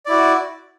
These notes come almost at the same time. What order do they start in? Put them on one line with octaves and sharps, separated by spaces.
D5 E4 F#4